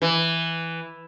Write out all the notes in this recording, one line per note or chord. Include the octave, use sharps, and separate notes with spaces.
E3